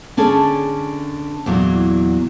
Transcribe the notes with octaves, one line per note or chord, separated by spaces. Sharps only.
D3 C#4 G#4 A4
E2 A#2 F#3